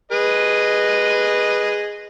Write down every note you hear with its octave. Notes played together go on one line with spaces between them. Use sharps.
G#4 B4 D#5